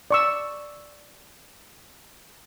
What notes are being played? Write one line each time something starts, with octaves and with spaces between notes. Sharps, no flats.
D5 C#6 E6